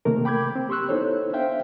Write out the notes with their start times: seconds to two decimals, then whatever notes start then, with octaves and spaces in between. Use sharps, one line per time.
0.05 C3 D#3 A3 A#3 A#4
0.25 G5 B5 D6 G6 G#6
0.56 C4
0.69 G4 C6 C#6 E6 F#6
0.89 B3 D#4 E4 A4 C5 C#5
1.33 D4 C5 E5 F5 G5